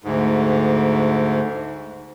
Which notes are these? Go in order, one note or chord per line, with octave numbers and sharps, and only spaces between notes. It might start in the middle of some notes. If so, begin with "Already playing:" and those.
D2 G#2